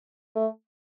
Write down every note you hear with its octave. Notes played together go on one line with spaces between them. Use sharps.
A3